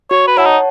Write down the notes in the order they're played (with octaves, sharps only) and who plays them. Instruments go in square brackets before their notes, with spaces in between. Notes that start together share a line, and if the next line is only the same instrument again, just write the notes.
[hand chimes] F#4 [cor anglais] C#5
[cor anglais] B4
[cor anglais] E4 [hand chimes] C#5 F#5 A5
[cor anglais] D#4